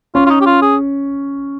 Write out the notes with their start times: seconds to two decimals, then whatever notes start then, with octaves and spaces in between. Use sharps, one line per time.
0.15 C#4 F4
0.26 F4
0.30 D#4
0.41 G4
0.46 F4
0.62 G#4